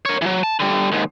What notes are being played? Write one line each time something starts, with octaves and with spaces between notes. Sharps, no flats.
A#4 C#5
E3 F#3
A5
D3 G3
D#2 G#2